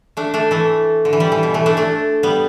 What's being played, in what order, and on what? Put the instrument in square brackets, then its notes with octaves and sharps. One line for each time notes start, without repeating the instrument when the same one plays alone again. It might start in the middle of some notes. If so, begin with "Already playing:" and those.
[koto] A3 D4
A3 D4
E3 A3
D3
E3
G3
E3
B2
E3 A3
A3 D4
A3 D4
G3 B3